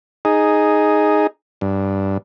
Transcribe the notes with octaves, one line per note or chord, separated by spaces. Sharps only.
D#4 G#4
G2